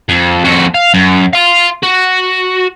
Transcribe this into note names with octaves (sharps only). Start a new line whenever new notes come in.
F2
F2 F#4
F5
F#2
F5 C6
F#4